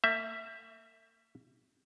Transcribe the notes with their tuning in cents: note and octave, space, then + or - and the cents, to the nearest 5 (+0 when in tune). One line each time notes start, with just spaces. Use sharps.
A#3 -45 E5 +0